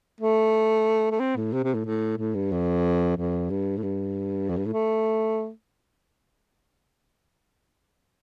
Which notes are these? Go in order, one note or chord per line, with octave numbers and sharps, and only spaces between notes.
A3
A3
C4
A2
C3
C3
A2
A2
A2
G2
F2
F2
G2
A2
G2
F2
G2
A2
A3